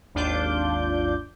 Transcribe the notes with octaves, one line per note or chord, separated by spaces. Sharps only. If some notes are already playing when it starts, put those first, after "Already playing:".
G#1 D#2 D4 F4 D6 G6